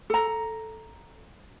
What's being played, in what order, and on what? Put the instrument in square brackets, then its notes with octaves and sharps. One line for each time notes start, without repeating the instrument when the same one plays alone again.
[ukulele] A4 A#5